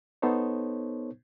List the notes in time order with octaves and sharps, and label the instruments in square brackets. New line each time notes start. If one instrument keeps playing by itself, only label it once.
[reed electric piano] B3 D#4 A4 C5 C#5